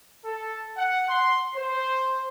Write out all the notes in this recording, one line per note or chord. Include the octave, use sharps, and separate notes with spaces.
A4
F#5
C6
C5